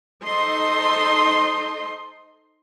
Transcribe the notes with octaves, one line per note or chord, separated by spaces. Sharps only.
D#4 A4 C5 D#5 C6